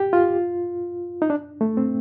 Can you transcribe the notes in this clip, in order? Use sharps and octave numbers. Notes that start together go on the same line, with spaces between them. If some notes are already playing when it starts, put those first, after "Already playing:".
Already playing: G4
F4
D#4
D4
A3
C4